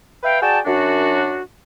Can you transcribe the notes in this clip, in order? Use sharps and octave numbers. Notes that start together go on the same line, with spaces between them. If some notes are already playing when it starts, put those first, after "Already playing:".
B4 E5 F5 G5
F#4 G#4 D5 G5 A5
F#2 D4 F#4